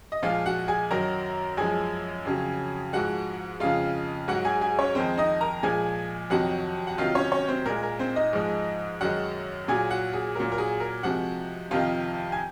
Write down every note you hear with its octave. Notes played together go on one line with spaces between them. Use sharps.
D#5
A#2 F3 G#3 F4 F5
F#4 F#5
G#4 G#5
F#2 D#3 F#3 A#4 A#5
F#2 F3 G#3 G#4 G#5
F2 C#3 F#3
G#2 F3 G#3 F#4 F#5
F2 C#3 G#3 F4 F5
G#2 F#3 F#4 F#5
G#4 G#5
G#4 G#5
C#4 C#5
F2 D#3 G#3 C4 C5
D#4 D#5
A#4 A#5
A#2 F3 G#3 G#4 G#5
F2 C3 D#3 F#3 F#4 F#5
F#5
C3 D#3 F#3 F4 F5
C#4 C#5
C#4 C#5
C4 C5
A#2 G#3 A#4
A#4
C4 C5
D#4 D#5
G#2 F3 G#3
F#2 D#3 G#3 F#4 F#5
A#2 F#3 G#4 G#5
F#4 F#5
G#4
A#2 F#3 A#4
A#4
G#4
A#4
C3 F3 G#3 F#4 F#5
F2 C3 D#3 F4 F5
G#5